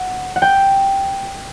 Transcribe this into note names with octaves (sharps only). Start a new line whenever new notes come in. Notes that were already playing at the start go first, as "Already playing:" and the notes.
Already playing: F#5
F#5
G5